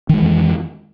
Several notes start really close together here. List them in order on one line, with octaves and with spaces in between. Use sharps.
D#3 G#3 E3 F2